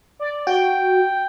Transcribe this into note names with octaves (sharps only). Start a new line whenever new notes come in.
D5
F#4 G5